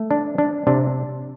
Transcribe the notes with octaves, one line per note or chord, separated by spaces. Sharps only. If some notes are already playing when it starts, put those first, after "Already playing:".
Already playing: A3
D4
D4
C3 D4